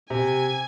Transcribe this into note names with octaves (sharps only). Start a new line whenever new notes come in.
C3 G#5